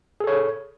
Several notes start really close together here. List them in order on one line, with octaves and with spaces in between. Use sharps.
G#4 A4 C#5